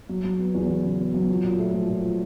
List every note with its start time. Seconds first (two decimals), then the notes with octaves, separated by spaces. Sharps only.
0.09 F#3
0.24 F#3
0.39 B3
0.54 E2
0.69 F#3
0.85 C#3
0.99 B3
1.14 F#3
1.29 F3
1.43 A#2
1.59 A3
1.74 F3
1.89 A#2
2.03 F3